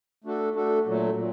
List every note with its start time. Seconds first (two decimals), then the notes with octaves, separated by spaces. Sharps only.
0.24 A3 D4 F#4 A4
0.55 A3 D4 F#4 A4
0.85 A#2 F#3 A3
1.16 A#2